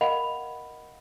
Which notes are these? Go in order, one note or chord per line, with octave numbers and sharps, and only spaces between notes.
A#4 D#5 F5 F#5 B5 F7